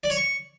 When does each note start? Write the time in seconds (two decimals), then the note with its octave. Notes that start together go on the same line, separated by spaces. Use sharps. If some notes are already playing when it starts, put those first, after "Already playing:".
0.04 D5
0.10 C#5
0.16 C#6